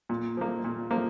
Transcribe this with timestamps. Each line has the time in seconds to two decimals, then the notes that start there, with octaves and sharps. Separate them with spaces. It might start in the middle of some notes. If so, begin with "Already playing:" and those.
0.09 A#2
0.37 F3 A#3
0.64 A#2
0.91 F3 A#3